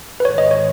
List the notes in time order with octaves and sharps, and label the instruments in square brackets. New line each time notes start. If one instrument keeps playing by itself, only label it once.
[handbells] B4
[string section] G#2 D#3 G#3 [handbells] C#5
[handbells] D#5
C#5